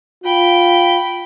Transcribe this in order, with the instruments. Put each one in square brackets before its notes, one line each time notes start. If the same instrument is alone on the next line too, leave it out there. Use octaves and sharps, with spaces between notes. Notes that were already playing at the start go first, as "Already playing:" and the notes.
[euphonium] F4 [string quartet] G5 B5